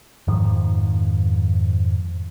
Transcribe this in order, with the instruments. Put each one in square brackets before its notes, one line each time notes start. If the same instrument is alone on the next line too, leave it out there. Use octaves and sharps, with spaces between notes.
[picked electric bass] F2 G#2 D#3 F3